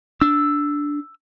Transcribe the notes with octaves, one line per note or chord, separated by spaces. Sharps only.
D4 E6